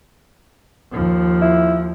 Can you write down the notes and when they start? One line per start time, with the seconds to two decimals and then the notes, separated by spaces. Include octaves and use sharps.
0.91 D#2 F3
1.42 E4